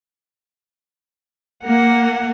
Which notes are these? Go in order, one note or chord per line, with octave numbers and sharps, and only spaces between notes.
A#3 F#5